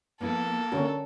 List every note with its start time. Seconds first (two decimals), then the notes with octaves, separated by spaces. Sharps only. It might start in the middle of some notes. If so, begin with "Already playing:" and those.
0.21 F3 A#3 B3 E4 A4
0.72 D3 C#4 F#4 A#4